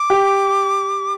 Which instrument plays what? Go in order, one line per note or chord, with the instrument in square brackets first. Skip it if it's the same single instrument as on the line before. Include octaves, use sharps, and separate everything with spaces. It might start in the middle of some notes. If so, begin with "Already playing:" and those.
Already playing: [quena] D6
[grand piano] G4